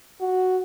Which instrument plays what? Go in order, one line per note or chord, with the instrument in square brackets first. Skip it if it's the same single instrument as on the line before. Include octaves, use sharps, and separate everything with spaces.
[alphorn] F#4